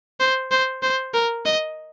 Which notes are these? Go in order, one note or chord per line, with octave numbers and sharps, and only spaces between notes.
C5
C5
C5
A#4
D#5